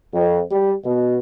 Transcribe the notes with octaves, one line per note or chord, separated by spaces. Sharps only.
F2
G3
B2